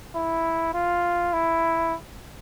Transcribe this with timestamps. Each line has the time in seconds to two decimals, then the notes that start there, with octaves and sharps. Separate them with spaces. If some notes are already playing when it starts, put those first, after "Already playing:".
0.15 E4
0.73 F4
1.33 E4